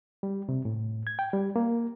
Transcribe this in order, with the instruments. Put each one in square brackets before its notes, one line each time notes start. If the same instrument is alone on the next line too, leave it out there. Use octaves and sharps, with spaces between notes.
[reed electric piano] G3
C3
A2
G#6
G5
G3
A#3